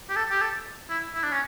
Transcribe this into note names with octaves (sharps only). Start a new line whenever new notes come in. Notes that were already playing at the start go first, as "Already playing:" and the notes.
G4
A4
G4
A4
E4
E4
D4
C#4